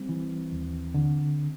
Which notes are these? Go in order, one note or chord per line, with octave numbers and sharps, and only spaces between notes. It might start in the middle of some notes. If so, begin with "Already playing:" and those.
Already playing: G3 C4
E3
D#2
D3